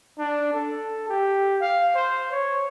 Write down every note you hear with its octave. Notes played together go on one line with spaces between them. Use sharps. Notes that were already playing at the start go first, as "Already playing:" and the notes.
D4
A4
G4
F5
C5
C#5